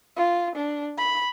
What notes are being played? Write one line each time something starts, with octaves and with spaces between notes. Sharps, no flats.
F4
D4
B5